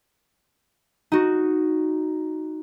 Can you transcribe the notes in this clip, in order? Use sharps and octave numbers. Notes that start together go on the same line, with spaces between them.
D#4 F#4